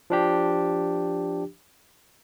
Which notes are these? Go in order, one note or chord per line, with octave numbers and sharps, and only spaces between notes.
F3 D4 G4